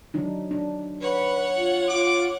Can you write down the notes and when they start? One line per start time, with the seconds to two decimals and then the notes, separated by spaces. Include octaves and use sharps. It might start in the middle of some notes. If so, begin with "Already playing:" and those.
0.14 F#3 D4 D#4
0.51 D4
1.01 B4 C#5 F#5
1.55 F4
1.90 F4 D6